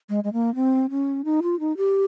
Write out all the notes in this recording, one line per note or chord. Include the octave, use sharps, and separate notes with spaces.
G#3
G#3
A#3
C4
C#4
D#4
F4
D#4
G4